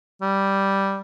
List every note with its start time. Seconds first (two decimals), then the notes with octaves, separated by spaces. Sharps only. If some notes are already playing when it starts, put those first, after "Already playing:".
0.22 G3